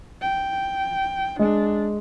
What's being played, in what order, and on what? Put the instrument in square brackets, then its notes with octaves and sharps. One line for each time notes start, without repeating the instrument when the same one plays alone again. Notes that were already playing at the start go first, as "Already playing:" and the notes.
[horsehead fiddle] G5
[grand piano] G#3 [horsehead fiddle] D4